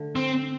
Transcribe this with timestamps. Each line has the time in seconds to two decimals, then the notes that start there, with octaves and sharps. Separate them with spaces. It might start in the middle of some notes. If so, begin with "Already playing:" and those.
Already playing: D3 A3
0.16 C4